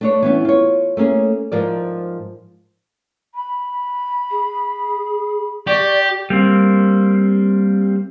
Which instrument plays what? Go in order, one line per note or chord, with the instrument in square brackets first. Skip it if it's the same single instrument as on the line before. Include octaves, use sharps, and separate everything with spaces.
[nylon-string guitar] A3 D4 C#5
E3 B3 C#4
F4 C#5
A3 A#3 C#4 G#4
G#2 F3 A#4 D5
[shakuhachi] B5
[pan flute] G#4
[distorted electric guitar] G4 [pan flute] D5 [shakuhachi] C#6
[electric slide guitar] G3 A#3 C4